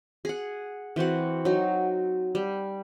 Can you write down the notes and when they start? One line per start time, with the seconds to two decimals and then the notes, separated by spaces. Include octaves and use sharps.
0.25 G#4 F#5
0.96 E3 C4 F#4 F#5
1.45 F#3 D#4
2.35 G3